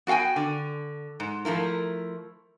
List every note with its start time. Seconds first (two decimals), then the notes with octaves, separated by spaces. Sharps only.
0.07 B3 F#4 F5 G5 G#5
0.36 D3
1.20 G#2
1.45 F3 A3 E4 A#4